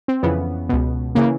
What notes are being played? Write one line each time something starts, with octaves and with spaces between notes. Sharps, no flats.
C4
F2 C#3 E3 B3
C#2 B2
C#3 E3 A#3